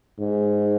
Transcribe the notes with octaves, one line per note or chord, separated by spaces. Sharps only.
G#2